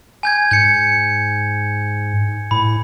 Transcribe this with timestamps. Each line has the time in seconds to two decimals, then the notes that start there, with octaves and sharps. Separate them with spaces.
0.23 G#5 G6 G#6
0.51 G#2 G6 C#7
2.51 A2 B5